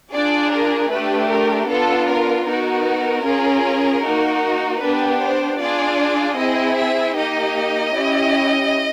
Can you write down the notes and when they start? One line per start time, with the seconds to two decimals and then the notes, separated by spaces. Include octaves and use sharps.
0.12 D4 F4 G#4 D5
0.51 A#4
0.91 A3 D4 G4 B4
1.30 A#4
1.69 B3 D4 F4 A4
2.08 A#4
2.46 B3 D#4 F#4 A#4
3.25 C#4 F4 G#4
4.03 A#3 D#4 F#4
4.81 B3 D4 G4 B4
5.21 C5
5.59 D4 F4 G#4 D5
6.38 C4 E4 G#4 D#5
6.77 E5
7.16 A#3 D#4 G4 D#5
7.95 C#4 E4 G4